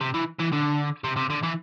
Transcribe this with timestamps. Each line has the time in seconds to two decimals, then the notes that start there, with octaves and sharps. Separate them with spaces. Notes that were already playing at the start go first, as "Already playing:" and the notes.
0.01 C3
0.14 E3
0.40 E3
0.53 D3
1.04 C3
1.17 C3
1.30 D3
1.43 E3